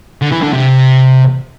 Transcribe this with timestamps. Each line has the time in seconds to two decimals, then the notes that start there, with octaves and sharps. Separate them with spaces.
0.22 D3
0.32 E3
0.43 D3
0.53 C3